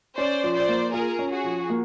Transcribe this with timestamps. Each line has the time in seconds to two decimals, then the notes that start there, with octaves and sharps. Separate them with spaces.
0.18 C#4 C5 D5
0.44 F3
0.55 C5 D5
0.68 A#3
0.93 F4 G#4 A#4
1.19 C#4
1.32 F#4 G#4
1.44 F3
1.70 A#3